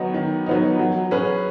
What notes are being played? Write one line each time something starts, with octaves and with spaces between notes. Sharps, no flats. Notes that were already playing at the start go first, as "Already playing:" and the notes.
Already playing: D#3 F#3 B3 D#4
D#3
F#3 B3 D#4
F#3
C#4 G#4 B4